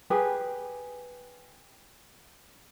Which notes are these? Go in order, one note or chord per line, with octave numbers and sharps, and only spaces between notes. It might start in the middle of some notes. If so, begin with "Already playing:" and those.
G4 G#4 B4